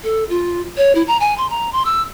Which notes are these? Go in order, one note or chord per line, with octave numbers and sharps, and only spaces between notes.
A4
F4
C#5
E4
A#5
G#5
C6
A#5
C6
E6